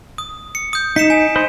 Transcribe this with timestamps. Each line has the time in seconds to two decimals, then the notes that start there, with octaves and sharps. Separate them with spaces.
0.18 D#6
0.55 C#7
0.73 D#6 G6
0.96 D#4 B6 C#7 E7
1.10 G#5
1.36 C5 D#5 B5